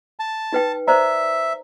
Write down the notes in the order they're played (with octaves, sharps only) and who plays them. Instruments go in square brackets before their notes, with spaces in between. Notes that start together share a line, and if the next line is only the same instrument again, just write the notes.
[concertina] A5
[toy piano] D#4 B4 G5
[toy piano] C5 D5 A#5 [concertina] E5